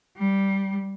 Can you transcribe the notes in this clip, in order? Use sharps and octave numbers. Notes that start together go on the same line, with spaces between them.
G3